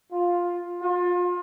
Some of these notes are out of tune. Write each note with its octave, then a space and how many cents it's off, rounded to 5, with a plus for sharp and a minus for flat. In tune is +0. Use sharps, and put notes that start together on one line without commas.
F4 +10
F4 +30